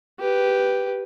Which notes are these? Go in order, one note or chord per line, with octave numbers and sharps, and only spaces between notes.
G4 B4